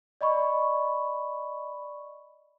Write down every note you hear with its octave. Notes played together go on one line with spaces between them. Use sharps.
D5 D#5 B5 C#6